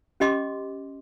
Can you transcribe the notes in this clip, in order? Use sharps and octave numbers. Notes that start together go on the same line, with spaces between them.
C#4 G4 D#5 C6 D6